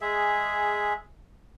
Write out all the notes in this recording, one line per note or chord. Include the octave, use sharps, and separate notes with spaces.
G#3 G#4 E5